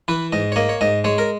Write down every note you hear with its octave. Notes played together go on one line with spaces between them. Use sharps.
E3 B4
G#2 D#5
C#5
A#3 D#5
C#5
G#2 D#5
G#3 C#5
A#4